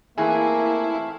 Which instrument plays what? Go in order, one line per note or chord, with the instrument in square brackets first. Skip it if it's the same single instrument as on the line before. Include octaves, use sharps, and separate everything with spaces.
[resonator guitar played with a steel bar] E3 G#4 [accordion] A3 C4 F5 [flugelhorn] A#3 [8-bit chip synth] E4